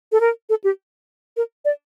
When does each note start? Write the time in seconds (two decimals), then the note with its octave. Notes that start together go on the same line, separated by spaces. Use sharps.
0.12 A4
0.20 A#4
0.49 A4
0.64 G4
1.36 A#4
1.65 D5